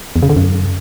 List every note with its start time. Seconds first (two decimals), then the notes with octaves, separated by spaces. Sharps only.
0.16 E2
0.23 C#3
0.30 D3
0.36 F#2